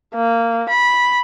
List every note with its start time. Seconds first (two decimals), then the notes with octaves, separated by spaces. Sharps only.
0.15 A#3
0.69 B5